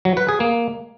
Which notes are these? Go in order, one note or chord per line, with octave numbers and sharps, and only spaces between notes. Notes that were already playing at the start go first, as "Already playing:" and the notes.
F#3
B4
G#4
A#3